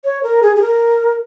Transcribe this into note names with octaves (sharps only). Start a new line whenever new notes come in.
C#5
A#4
G#4
G#4
A#4